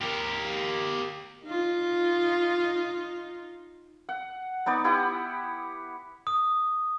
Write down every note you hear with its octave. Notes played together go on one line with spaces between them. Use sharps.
G4 A#4
D#4 F4
F#5
B3 D#4 D5
E4 G4 F#5 D#6
D#6